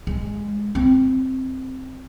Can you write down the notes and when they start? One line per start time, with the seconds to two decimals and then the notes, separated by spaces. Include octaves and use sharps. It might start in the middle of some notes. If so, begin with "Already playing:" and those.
0.07 G#3
0.75 C4